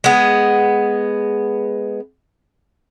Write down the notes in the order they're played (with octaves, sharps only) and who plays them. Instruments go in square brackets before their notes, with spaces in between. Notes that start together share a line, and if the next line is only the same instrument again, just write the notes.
[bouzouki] G#3 B3